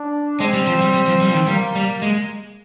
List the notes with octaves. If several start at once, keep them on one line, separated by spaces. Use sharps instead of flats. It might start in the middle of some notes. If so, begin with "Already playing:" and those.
Already playing: D4
G#3 C4
G3
F3
G3
G3
F3
G3
F3
D#3
G3 A#3
G3
G#3